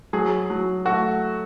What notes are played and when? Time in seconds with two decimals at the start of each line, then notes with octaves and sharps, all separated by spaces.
0.13 F#3 G#4
0.50 F#3
0.85 A3 F#4